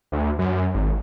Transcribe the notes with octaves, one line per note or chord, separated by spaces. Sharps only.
D2
F#2
G#1